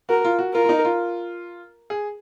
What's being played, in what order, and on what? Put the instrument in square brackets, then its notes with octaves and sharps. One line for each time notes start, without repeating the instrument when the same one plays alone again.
[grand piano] F#4 [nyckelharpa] A#4
[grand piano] F4
F#4
[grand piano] F4 [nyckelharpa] A#4
[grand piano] F4
D#4
F4
G#4